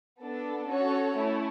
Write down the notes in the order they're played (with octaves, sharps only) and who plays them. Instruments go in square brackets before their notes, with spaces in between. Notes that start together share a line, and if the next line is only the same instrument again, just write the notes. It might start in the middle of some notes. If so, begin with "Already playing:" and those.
[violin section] B3 D4 A4
C#4 F#4 A4 C#5
A3 C#4 E4